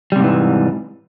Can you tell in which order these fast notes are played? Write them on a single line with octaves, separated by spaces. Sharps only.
G3 C3 G#2 E3